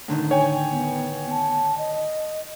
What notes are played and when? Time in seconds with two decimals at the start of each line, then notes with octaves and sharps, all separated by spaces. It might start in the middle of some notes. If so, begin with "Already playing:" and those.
0.08 A2 D3 D#3
0.31 C#5 G5 G#5
0.72 B3
1.30 A5
1.78 D#5